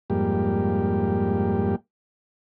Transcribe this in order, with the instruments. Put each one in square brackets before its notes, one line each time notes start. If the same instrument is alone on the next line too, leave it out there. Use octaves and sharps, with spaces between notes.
[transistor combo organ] F2 G#2 G3 A#3 G4